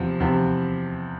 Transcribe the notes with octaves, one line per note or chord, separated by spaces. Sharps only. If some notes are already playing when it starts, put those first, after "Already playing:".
Already playing: E2 C3 F3
E2 C3 F3